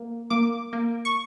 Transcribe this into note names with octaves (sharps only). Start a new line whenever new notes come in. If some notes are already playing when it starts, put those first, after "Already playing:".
Already playing: A#3
A#3 D6
A#3
C#6